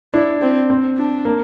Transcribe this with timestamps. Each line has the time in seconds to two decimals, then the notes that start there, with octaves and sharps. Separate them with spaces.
0.13 D4 E4
0.41 C4
0.70 C4
0.97 D4
1.25 A#3